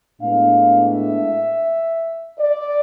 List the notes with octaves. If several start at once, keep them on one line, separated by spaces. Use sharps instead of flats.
A2 G#3 B3 D4 F5
E5
D5